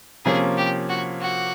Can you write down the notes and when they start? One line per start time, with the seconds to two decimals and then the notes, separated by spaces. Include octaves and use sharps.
0.25 C3 F3 A#3 C#4 G#4
0.57 G4
0.89 F#4
1.21 F#4